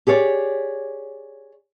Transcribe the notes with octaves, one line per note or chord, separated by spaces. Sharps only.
G4 G#4 C#5 D5